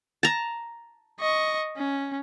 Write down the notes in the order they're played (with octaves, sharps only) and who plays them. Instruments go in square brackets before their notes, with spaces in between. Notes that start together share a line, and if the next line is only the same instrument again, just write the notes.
[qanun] A5 A#5
[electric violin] D#5 C#6
C#4